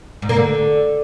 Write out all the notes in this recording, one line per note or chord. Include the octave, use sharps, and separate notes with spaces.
G#2
A#3
D3